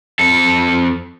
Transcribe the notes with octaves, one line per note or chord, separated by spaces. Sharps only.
F2 A4